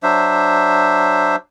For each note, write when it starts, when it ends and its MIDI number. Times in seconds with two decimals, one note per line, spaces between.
0.03 1.36 54
0.03 1.36 62
0.03 1.36 72
0.03 1.36 76